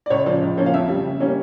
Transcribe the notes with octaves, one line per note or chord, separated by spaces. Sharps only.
D5
C#2 C#5
C#3 F3 D5
C#2
C#3 F3 A#3 C#4
F5
F2 E5
C#3 G3
C#3
G3 A#3 C#4